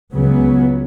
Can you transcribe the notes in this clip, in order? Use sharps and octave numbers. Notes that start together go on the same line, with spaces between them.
C#2 C#3 F#3 B3